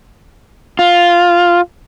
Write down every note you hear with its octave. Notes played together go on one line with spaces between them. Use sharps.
F4